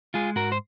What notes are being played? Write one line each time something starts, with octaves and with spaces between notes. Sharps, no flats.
G#3 F4 G#4
G#2 F#4 A#4
C5